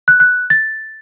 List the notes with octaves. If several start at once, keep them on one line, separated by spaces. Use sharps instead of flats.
F#6
F#6
A6